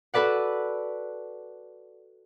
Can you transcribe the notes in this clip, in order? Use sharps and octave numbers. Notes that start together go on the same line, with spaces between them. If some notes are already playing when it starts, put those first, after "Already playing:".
F#4 A4 B4 D5 F#5